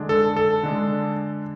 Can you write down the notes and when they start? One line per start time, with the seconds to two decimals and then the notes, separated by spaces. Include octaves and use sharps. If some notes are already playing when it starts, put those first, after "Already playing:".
Already playing: D3 G#3 D4
0.09 A4
0.36 A4
0.63 D3 G#3 D4